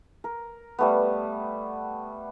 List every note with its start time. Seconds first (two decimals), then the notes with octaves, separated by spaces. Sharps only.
0.24 A#4
0.79 G3 A3 B3